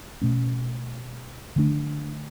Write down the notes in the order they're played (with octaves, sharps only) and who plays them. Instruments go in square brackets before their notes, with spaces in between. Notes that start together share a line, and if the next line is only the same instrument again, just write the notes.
[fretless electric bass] B2 A3 C#4
D3 A3 D4